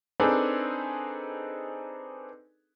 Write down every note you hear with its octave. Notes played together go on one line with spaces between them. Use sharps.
C4 D4 D#4 G#4 A4 B4